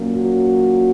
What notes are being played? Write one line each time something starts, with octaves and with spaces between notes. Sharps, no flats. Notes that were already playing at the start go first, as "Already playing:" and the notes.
Already playing: A#2 F#3 A#3 C#4
F#4